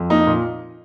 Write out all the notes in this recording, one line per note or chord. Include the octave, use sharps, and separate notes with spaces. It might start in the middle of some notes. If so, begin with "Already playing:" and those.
Already playing: F2
A#3 D#4
A#2